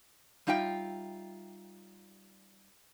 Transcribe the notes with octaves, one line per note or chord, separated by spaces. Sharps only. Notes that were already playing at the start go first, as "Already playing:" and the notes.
G3 D#4 F4 E5 G5